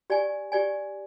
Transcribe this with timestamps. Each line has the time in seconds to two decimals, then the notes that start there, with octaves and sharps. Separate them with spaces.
0.10 G4 D5 G#5
0.52 G4 D5 G#5